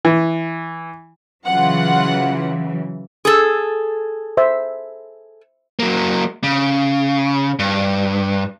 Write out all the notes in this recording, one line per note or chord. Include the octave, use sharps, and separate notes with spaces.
E3
C#3 E3 F#3 F4 F#5
G#4 A4
C5 E5
F#3 A#3
C#3
G2